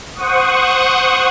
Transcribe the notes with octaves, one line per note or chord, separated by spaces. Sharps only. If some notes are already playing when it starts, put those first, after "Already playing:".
C5 F#5 C#6 D#6